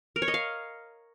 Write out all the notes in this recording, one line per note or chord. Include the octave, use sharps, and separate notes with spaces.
A#4
C#5
D#5
F5